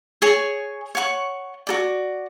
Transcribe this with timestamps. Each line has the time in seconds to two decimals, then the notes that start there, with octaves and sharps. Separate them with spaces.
0.22 G#4 C#5 G#5
0.95 C#5 F#5 C#6
1.67 F#4 A4 D5